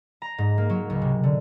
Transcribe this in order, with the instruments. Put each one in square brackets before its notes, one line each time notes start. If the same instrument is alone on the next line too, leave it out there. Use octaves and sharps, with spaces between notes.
[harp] A#5
G#2
A#3
F#3
C#2
C3
D3